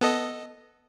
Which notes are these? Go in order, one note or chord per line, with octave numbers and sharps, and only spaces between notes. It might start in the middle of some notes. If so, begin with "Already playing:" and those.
B3 A4 D#5